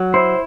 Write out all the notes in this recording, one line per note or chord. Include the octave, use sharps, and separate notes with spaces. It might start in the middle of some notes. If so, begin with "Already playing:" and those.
Already playing: F#3
E4 C5